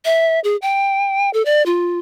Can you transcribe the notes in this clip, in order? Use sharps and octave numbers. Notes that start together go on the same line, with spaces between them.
E5
G#4
G5
A4
D5
F4